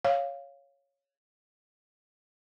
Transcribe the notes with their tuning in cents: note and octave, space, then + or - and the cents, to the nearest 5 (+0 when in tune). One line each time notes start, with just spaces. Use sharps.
C#5 +0 F5 +0